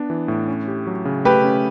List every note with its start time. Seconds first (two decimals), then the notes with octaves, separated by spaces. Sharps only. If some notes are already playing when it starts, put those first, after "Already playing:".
Already playing: B3 D4
0.10 E3
0.28 A2
0.48 C#4
0.68 G4
0.87 F#3
1.05 C#3
1.25 A3 G4 B4
1.44 C#4